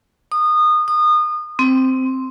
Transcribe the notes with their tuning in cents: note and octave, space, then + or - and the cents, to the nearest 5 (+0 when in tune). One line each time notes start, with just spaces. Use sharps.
D#6 -25
D#6 -30
C4 -5